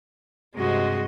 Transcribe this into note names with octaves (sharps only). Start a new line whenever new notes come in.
G2 C3 G#3 F#4 D#5